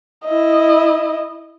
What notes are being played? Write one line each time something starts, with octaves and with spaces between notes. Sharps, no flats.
E4 D#5